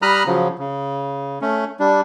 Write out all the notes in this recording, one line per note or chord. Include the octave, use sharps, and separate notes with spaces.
G3 A#5 B5 D#6 F6 F#6
C#3 F3 F#3
C#3
A3 C#4
G3 D4